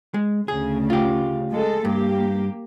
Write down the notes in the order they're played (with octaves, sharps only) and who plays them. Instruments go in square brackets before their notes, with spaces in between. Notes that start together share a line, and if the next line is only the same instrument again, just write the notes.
[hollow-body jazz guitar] G#3
[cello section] D2 C#3 [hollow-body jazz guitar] G#4
[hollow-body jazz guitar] F4 G4
[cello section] G#3 A4
[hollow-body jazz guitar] G2 [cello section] A#3 G4